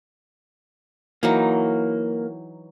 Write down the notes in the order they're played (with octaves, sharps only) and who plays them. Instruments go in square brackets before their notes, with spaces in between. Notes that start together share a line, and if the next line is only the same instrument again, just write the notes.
[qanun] E3 F#3 D#4 [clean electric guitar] A#3